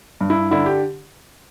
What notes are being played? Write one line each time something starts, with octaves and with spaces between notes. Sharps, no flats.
G2
E4
D3 E4
G4